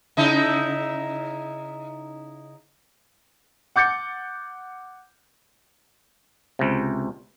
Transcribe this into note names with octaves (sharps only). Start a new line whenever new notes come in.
C#3 D#4 E4
F#5 D6 G6 A6 C#7
C#2 C3